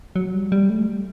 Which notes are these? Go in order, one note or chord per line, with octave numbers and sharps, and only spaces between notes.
F#3
G3
G3
A3
G3